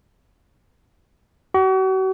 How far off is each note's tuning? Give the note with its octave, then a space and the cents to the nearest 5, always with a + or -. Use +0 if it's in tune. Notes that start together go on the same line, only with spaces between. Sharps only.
F#4 +40